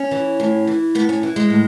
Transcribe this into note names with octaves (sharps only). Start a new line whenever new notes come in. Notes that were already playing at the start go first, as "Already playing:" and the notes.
Already playing: C#4
E3
A2
E3
A2 B3
C#4
E3
G#3
A2